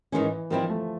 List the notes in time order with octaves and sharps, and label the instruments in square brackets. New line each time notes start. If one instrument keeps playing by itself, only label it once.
[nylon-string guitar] G#2 D#3 G#3 C#4 [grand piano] E3
[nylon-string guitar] D#3 G3 C4 E4 [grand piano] F3
[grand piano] A3